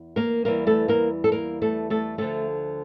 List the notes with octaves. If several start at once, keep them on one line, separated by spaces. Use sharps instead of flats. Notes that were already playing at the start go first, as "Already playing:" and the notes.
Already playing: E2
A#3 A#4
E2 E3 G3 A#3 A#4
A3 A4
A#3 A#4
A4
A#3 A#4
A3 A4
A3 A4
D2 D3 F3 A3 A4